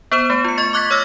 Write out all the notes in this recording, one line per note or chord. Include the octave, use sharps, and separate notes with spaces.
B3 C5 E7
A3
F4 C#7
D#5 C#6 A6
C#6 D6 F#6 G#6 A6 B6
C#5 E6 F6 A#6